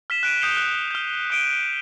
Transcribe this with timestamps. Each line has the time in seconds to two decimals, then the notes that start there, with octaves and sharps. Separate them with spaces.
0.10 F6 B6 E7
0.23 F#6 D7 D#7
0.41 D#6 G6 C7 C#7 F7 G7
0.56 F#6
0.91 F6 G6
1.30 D#6 D7 D#7